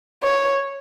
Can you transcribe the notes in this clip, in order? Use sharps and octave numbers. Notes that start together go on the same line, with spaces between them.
C#5